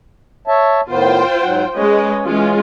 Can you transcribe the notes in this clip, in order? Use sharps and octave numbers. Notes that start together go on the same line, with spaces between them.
C#5 E5 A5
A2 D#3 B3 F4 C5 G5
G#2 F#3 F#5
G#3 C#4 B4 C#5 D#5
E3 G#3 C#4 F4